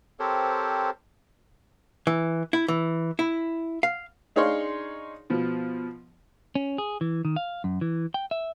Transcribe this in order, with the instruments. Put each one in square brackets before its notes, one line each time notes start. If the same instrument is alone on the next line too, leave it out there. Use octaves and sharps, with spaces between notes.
[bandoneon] C4 G4 A4 A#4 C5 C#5
[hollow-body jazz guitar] E3
E4
E3
E4
F5
[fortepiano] D4 D#4 G#4 C#5 F5 C6
B2 F3
[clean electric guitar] C#4
G#4
E3
D#3
F5
F#2
E3
G5
E5